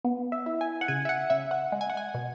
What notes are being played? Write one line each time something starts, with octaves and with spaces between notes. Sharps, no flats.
B3
E5
E4
G#5
F#5
C#3 G#5
E5
F#5
C#3 E5
F#5
G#3
G#5
F#5
G#5
B2